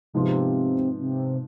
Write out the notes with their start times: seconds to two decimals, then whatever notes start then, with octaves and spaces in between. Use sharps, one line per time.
0.13 G#2 C3 F3 B3 F4
0.99 C3